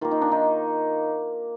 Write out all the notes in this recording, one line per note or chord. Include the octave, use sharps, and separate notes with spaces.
D#3 A#3 F4
D#4
D4
D#4